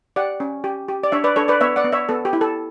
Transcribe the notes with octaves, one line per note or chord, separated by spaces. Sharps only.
G4 D5 F#5
C#4
G4
G4
D5
D4 C#5 E5
B4 D5
D4 A4 C#5
B4 D5
B3 C#5 E5
D5 F#5
B3
C#5 E5
B3 A4
G4
E4
A4